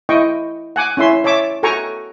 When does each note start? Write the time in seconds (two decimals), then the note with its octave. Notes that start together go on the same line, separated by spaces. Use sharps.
0.09 E4 D#5 G5 C#6
0.76 F#5 G#5 D6
0.97 C#4 E4 E5 C6
1.24 C#5 E5 A5 D6
1.63 F#4 A4 G5 G#5 A#5 C#6